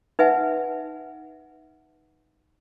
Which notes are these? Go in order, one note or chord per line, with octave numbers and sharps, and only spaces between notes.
D#4 B4 E5 F#5 G#5